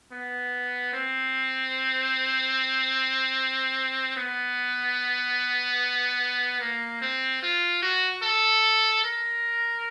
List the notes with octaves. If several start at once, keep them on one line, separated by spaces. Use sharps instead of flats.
B3
C4
B3
A#3
C4
F4
F#4
A4
A#4